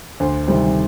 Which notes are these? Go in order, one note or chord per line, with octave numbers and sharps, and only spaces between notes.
D2 C5
C3 D#3 G3 C4